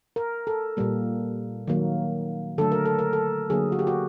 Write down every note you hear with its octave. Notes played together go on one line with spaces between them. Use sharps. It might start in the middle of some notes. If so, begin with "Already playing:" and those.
A#4
A4
A#2 G3 A#3
D#3 F#3 A#3
D3 F#3 A3 A4
A#4
A4
A#4
A4
D3 F#3 A#3 G#4
F#4
G4
F#4